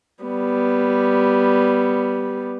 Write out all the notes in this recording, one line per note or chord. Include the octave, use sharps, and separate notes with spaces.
G3 B3